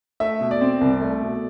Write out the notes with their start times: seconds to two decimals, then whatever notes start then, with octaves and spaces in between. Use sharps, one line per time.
0.20 A3 E5
0.41 B2
0.51 D5
0.61 C4
0.81 C2
1.01 A3
1.22 B2